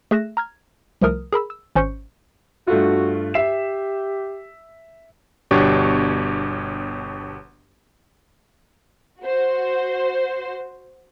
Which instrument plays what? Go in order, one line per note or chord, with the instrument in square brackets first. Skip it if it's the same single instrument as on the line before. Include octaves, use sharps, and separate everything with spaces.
[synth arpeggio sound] A3 G#4 E5 F#6 A#6 E7
A#5 F6 G#6
C2 F3 A3 A#4 D#6 F6
G#4 A#4 B5 E6
E6
G#1 C#4 C5 C#6 G6 C#7
[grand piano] G2 A3 F4 [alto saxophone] F#4
[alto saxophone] G4 [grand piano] E5 C7 E7
[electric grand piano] G1 B2 D4 G4 C#5 C#6
[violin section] F#4 C5